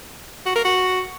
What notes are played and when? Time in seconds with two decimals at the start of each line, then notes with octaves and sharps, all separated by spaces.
0.46 F#4
0.56 A#4
0.65 F#4